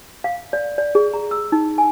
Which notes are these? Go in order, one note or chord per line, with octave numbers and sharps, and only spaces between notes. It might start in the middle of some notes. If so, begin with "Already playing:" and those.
F5
D5
D5
G#4
A#5
E6
D#4
G#5